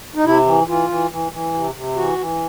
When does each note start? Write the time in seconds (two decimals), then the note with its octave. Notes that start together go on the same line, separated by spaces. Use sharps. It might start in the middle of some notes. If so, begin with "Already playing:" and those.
0.15 D#4
0.25 C3 E4
0.46 E3
0.67 E3 F4
0.90 E3
1.11 E3
1.32 E3
1.54 C3
1.75 C3
1.96 E3 F#4
2.18 E3